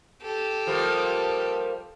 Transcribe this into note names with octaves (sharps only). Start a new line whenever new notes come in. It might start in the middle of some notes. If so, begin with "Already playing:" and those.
G4 A4
F3 G3 A#3